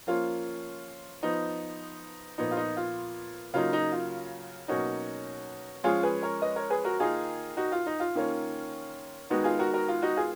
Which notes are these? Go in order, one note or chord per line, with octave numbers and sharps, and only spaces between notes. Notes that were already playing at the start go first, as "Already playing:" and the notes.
F3 A#3 C#4 F4
F3 B3 D#4
A#2 F3 B3 D#4
F4
D#4
F4
C#3 F#3 A#3 D#4 F4
D#4
F4
B2 F#3 A#3 C#4 D#4 F#4
F3 G#3 C#4 F4 G#4
G#4 B4
A#4 C#5
B4 D#5
A#4 C#5
G#4 B4
F#4 A#4
D#3 A#3 D#4 F4 G#4
D#4 F#4
F4
D#4
F4
D#3 A#3 C#4
D#3 G#3 B3 D#4 F#4
F4 G#4
F#4 A#4
F#4 A#4
F4
D#4 F#4
F4 G#4